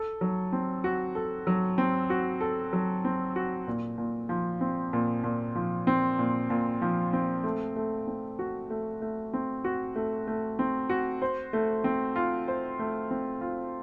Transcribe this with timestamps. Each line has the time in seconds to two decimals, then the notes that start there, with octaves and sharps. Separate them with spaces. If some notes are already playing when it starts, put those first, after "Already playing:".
Already playing: A4
0.21 F#3
0.53 C4
0.84 F#4
1.15 A4
1.47 F#3
1.78 C4
2.10 F#4
2.41 A4
2.73 F#3
3.05 C4
3.36 F#4
3.67 A#2
3.98 A#2
4.29 F3
4.61 C4
4.93 A#2
5.24 A#2
5.55 F3
5.87 C4
6.19 A#2
6.50 A#2
6.82 F3
7.13 C4
7.44 A3
7.76 A3
8.07 C4
8.39 F#4
8.70 A3
9.02 A3
9.33 C4
9.64 F#4
9.96 A3
10.27 A3
10.59 C4
10.90 F#4
11.22 C5
11.53 A3
11.84 C4
12.16 F4
12.48 C5
12.79 A3
13.11 C4
13.41 F4